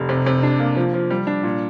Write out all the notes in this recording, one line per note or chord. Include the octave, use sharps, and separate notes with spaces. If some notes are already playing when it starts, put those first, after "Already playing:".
Already playing: F1
C3
C3
D4
A#3
F3
F3
G3
D4
A#2